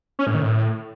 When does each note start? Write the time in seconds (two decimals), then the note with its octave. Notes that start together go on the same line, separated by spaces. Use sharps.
0.19 C#4
0.27 A2
0.34 D#3
0.42 A2